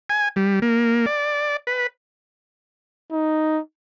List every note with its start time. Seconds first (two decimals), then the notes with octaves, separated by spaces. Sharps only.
0.10 G#5
0.36 G3
0.62 A#3
1.06 D5
1.67 B4
3.12 D#4